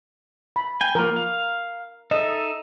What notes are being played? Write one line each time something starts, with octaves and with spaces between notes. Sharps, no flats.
B5
G5 G#5
F3 A#3 A#4
F5
D#4 A4 D#5 E5